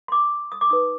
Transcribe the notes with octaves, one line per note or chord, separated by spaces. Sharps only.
C6
D6
D#6
D6
D#4 B4 D#6